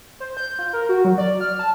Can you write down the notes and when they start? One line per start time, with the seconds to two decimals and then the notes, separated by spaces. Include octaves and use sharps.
0.20 C5
0.37 G6
0.59 F4
0.73 A#4
0.89 F#4
1.05 F#3
1.18 D5
1.41 F6
1.59 A5